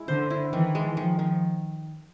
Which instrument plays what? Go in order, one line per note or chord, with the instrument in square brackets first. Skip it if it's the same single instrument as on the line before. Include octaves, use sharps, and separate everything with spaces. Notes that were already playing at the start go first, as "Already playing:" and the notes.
Already playing: [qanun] G#3 E4
[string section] D3 [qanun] C5
[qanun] E4
[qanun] D#3 [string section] E3
[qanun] G#3
[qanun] D#3 [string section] F3
[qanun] D#3